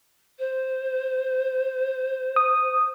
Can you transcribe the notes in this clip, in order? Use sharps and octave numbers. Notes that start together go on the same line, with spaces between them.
C5
D#6